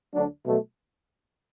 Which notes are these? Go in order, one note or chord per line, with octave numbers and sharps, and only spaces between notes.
D2 D3 F#3 D4
B2 F#3 A3